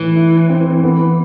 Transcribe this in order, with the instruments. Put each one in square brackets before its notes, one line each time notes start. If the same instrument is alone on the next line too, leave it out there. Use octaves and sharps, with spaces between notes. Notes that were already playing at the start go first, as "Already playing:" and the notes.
Already playing: [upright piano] A2 [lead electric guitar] E3
[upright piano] E4
C4
B3